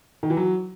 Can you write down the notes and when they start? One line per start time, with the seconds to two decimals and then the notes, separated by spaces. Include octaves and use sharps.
0.23 D#3
0.30 E3
0.37 F#3